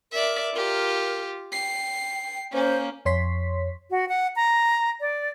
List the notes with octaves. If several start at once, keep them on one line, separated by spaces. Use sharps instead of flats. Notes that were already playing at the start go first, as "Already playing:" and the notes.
A#4 D5 E5
F4 G4 A#4
G5 C7
A#3 C#4 C5
F2 C#5 C6 B6
F#4
F#5
A#5
D5